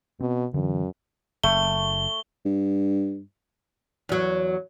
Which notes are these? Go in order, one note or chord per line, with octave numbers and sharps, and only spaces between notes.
B2 C4
F#2 D3 E3
F#1 A3 G7
G2
E2 F#3